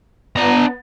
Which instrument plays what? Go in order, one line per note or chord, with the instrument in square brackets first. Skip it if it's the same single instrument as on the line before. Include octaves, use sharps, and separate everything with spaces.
[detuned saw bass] B3 [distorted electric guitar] D4 A#5